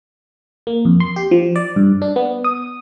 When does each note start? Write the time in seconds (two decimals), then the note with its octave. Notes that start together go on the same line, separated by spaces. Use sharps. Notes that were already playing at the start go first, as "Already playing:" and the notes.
0.67 A#3
0.85 F2
1.00 C6
1.16 G4
1.31 F3
1.56 D5
1.76 G2
2.02 D4
2.16 B3
2.44 D#6